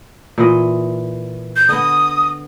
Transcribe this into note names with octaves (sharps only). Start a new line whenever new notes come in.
A#2 E3 D#5
G6
D3 B3 D#6